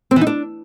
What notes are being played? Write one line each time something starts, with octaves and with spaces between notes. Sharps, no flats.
C4
E3
D#4
D4